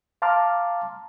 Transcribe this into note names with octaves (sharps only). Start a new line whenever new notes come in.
F5 A5 A#5 C6 D6 F6